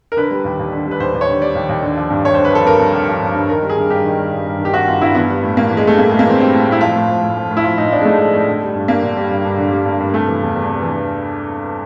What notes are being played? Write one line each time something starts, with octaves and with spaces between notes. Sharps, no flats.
A#4
D3 B4
G3
D#2
D#2
D3
G3
B4
D#2 C5
D#2
C#5
D3
G3 D5
D#2
D#2
D3
F3
G2
G2 C#5
C5
D3
B4
F3 A4
G2 A#4
G2
D3
F3
G2
G2
D#3 A#4
G3
G#4
G2
G2 G4
D#3
G3
G2
G2
D#3
G4
G3 F#4
G2 F4
G2 E4
E3 B3
G3
A2
A2 A#3
E3
G#3
G3 A3
A2 A#3
G#3
A2
A#3
E3 C4
G3 C4
A2
A2 E4
F3 F4
A2
F3
A2
F3
A2
E4
F3 F4
A2 D#4
F3 D4
G#3
A2 A3
F3
A2
D3
G3
G2
G2 A#3
D3
G3
G2
G2
D3
G3
G2
G2
C3 A3
E3
E2
E2
C3
E3